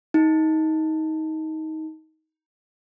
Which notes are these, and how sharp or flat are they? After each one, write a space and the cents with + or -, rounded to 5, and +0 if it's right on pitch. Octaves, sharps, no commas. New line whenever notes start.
D#4 +20